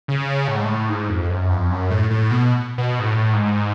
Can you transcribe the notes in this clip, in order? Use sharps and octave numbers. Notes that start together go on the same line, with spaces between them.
C#3
A2
G#2
A2
G#2
F2
F#2
F2
F#2
A2
A2
B2
B2
G#2
A2
G#2